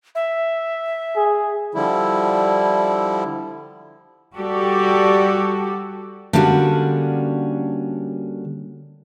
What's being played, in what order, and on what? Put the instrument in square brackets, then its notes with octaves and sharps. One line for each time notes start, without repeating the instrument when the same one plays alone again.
[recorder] E5
[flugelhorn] G#4
[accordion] D3 F3 G3 E4
[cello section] G3 F#4 G4 A4 D5
[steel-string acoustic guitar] D3 G3 A#3 C#4 D4 F#4